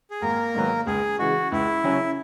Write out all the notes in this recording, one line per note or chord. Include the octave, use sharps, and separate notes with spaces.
G#4
G#1 A#3 A#4
G#2 D#3 F#3 B3
C#2 G#4
C#3 E3 G#3 F#4
C#2 E4
C#3 F#3 C#4 G#4